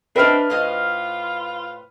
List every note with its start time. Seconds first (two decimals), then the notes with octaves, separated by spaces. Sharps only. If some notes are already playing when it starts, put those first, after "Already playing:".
0.16 C4 D4 B4 D#5 E5 F6
0.50 A2 F4 C5 D#5